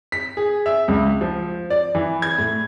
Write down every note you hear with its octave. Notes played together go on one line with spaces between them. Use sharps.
B6
G#4
E5
C#2
F3
D5
E3
G#6
A2